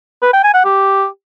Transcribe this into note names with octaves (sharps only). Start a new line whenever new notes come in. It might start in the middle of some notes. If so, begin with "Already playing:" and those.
B4
G5
G#5
F#5
G4